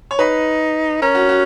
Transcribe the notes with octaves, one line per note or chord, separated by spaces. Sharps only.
C#5
D#4 B4
C#4 A#4
F#4
F#4